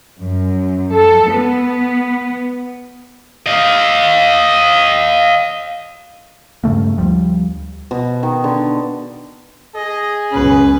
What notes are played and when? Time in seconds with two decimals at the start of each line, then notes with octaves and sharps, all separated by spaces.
0.21 F#2
0.94 A4
1.33 B3
3.46 D#5 F5
6.64 G2 C#3 A3 A#3
6.98 D2 F3 G3
7.91 B2
8.23 D#3
8.44 D3
9.75 G#4 D#5
10.32 C#2 F#2 B2 C#4 B4